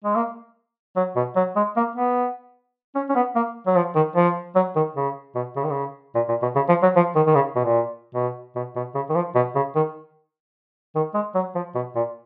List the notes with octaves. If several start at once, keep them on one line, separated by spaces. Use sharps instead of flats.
G#3
A#3
F#3
B2
F#3
G#3
A#3
B3
C#4
C#4
B3
A#3
F#3
F3
D#3
F3
F#3
D#3
C#3
B2
C#3
D#3
C#3
A#2
A#2
B2
C#3
F3
F#3
F3
D#3
D#3
C#3
B2
A#2
B2
B2
B2
C#3
D#3
F3
B2
C#3
D#3
D#3
G#3
F#3
F3
B2
A#2